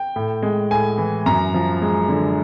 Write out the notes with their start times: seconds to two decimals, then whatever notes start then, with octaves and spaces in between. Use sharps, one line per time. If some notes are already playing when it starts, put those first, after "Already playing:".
Already playing: G5
0.16 A2
0.43 G#3
0.71 A2 G#5
0.98 E3
1.26 F#2 A#5
1.54 F3
1.82 G#3
2.08 D3